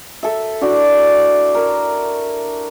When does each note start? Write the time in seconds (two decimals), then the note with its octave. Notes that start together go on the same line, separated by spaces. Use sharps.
0.23 A4 E5
0.61 D4 E4 F#4 D5
1.55 A#4